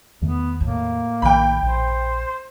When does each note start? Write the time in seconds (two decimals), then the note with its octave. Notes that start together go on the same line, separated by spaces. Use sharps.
0.21 E2 D#3 A3 B3
0.60 A2 A#3
1.22 A#1 D#3 G5 B5
1.62 A#1 C5